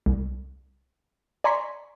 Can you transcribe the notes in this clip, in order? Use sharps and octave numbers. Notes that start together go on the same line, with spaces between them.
C2
D5 G#5 A#5 C6 C#6 B6